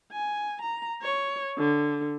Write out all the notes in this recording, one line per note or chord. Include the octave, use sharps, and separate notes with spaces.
G#5
A#5
C#5
D3